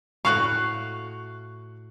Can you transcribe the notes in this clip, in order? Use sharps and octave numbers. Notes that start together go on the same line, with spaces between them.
A2 F#4 F5 C#6 F#6